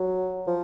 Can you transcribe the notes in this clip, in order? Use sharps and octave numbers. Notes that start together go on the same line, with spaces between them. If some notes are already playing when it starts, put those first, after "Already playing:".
Already playing: F#3
F3